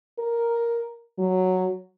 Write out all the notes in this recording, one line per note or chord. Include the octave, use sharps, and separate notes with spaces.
A#4
F#3